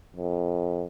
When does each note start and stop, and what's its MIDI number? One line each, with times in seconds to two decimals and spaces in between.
0.16 0.85 41